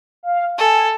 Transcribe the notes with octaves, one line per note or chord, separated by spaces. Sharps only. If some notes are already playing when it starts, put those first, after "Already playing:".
F5
A4 G#5